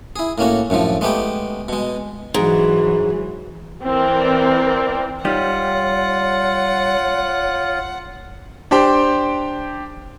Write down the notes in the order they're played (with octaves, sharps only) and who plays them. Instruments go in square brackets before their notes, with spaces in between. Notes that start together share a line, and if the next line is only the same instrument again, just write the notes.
[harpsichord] E4 G#4
A2 A#3 C#4 F#4
F#2 A2 D3 F3
G#3 A3 B3 G4 G5
B2 G#3
[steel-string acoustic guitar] G#2 [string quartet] E3 F#3
[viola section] E3 C4 A#4 D5
[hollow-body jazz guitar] G3 D#4 G4 [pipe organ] F4 [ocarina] C#5 [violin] F#5
[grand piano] D4 G4 C5 G5